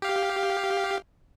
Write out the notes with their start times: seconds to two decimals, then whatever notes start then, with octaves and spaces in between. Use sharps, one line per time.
0.02 G4 F5